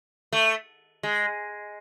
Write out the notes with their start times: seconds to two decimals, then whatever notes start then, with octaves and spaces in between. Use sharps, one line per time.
0.32 A3
1.03 G#3